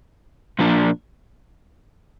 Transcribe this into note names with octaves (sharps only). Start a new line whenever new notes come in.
A#2 F3 A#3 D4